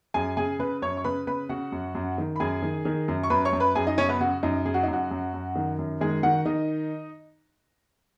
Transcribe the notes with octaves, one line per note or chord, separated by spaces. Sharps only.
F#2 G#4 G#5
C#3 G#4 G#5
C#3 B4 B5
F#2 C#5 C#6
C#6
C#3 B4 B5
C#3 B4 B5
C#3 F#4 F#5
F#2
F#2
D#3
B5
F#2 G#4 G#5
D#3
D#3
F#2
C#6
F#2 B4 B5
C#5 C#6
F#2
B4 B5
F#2 G#4 G#5
D#4 D#5
C#3 C#4 C#5
B3 B4
C#3 F#4
F#2 D#4
C#3 G#4
F#4
D#4
F#2
F#4
F#2
F#2
D#3
F#2
D#3 G#3 G#4
D#3 F#4 F#5
D#3 D#4 D#5